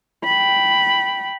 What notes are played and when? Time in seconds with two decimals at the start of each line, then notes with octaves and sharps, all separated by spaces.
0.24 G5 B5